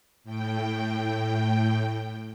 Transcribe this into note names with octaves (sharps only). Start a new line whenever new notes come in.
A2 G5